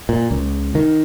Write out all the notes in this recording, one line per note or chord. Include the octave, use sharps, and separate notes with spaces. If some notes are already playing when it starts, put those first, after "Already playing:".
A#2
C#2
D#3